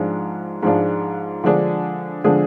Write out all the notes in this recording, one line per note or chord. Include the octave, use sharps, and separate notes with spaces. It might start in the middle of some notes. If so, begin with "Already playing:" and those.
Already playing: G#2 F3 G#3 D4 F4
G#2 F3 G#3 D4 F4
D3 F3 G#3 D4 G#4
D3 F3 G#3 D4 G#4